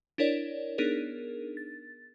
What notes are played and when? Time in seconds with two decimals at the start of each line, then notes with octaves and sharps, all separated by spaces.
0.18 D4 E4 A#4 C#5 D5
0.78 B3 D4 D#4 G#4 A#4
1.57 A6